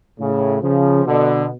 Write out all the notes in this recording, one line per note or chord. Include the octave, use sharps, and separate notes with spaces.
A2 C#3
C#3 F3
B2 D3